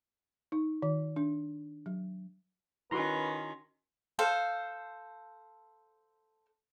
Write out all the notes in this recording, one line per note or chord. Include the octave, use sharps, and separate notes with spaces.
D#4
D#3
D4
F#3
D#3 C#4 E4 F#4 B4 A#5 C6
A4 C5 F5